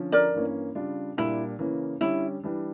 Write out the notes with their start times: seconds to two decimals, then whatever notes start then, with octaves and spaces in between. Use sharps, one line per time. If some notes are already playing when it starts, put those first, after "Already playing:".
Already playing: D3 F3 C#4
0.12 A#4 D5
0.34 G2 E3 A#3 C#4
0.75 C#3 G3 D4 F4
1.17 A#2 G3 D4 E4
1.59 C#3 E3 A#3 C#4
2.01 D3 G3 C#4 E4
2.43 E3 G3 D4